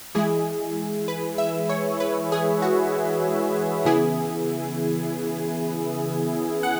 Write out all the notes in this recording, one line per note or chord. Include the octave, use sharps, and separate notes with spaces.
E3 G#3 E4 G#4
B4
E5
C#5
B4
G#4
F#4
C#3 E3 B3 E4 G#4
F#5